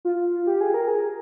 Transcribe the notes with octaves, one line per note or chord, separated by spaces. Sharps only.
F4
G4
G#4
A#4
G#4